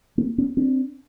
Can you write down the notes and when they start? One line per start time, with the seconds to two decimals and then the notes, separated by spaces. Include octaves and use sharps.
0.18 A#3 C4
0.38 B3 C#4
0.57 C4 D4